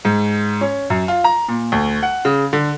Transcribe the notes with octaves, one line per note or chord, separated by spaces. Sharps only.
G#2
C#4
F#2
F4
A#5
A#2
D2
F#5
C#3
D3